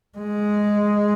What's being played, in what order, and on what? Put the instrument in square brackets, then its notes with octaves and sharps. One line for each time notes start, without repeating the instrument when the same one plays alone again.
[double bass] G#3